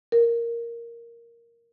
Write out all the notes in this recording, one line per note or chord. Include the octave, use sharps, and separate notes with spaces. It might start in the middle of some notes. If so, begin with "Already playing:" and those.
A#4